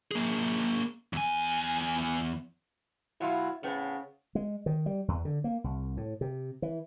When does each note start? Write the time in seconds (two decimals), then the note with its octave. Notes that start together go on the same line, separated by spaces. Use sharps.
0.11 A#3 G#4
1.13 E2 G#5
3.21 B2 F#3 E4 F4
3.63 A2 C#3 B3 C4
4.35 G#3
4.66 D#3
4.86 G3
5.08 E2
5.25 D3
5.44 A#3
5.64 C2
5.97 A2
6.21 C3
6.62 E3